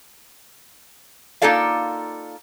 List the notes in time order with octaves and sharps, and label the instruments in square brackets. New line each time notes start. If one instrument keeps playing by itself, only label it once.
[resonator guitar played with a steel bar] A#3 D#4 F4 A4 D5 F5